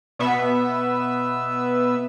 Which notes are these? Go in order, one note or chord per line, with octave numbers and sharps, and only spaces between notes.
B2 B3 E5